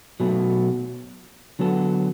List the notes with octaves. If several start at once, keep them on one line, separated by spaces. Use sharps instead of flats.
B2 F#3 A3
D3 F#3 B3 F#4 A4